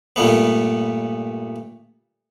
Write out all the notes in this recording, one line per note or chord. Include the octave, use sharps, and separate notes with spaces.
G2 A#2 A3 B3